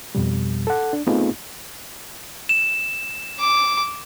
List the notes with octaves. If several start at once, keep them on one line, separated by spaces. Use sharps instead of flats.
F2 B2 G3
A4 F#5
D4
A3 B3 C4 D#4 F4 G#4
E7
D6